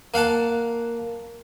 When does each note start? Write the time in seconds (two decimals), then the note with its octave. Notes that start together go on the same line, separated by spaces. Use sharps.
0.14 A#3 F5 F#5 A5